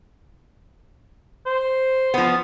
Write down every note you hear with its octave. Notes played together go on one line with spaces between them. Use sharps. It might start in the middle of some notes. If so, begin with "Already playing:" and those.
C5
F3 B3